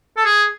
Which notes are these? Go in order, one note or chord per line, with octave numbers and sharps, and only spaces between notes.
A4
G#4